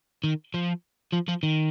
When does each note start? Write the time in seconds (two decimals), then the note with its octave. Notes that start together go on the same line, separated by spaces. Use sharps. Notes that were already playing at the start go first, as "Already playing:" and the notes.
0.24 D#3
0.54 F3
1.13 F3
1.28 F3
1.43 D#3